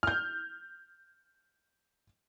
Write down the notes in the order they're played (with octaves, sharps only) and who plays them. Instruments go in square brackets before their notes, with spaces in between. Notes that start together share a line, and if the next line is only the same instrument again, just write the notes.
[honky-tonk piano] F6 G6